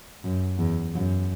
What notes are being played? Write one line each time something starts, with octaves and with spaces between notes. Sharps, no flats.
F#2
E2
F#2